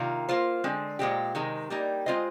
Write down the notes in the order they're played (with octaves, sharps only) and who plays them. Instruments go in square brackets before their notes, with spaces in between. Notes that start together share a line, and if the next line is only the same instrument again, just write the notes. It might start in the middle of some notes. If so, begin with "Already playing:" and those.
Already playing: [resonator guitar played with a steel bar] C3 D#3 A#3 F4
A#3 F4 C5
D3 G#3 C4
A#2 G#3 C4 G4
C3 D#3 G#3
G3 A#3 D#4 G4
G#3 C4 F4 C5 D#5